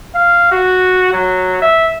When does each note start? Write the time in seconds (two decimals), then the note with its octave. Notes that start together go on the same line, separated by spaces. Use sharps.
0.14 F5
0.52 F#4
1.13 F#3
1.62 E5